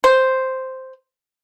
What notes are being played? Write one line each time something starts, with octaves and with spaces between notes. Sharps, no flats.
C5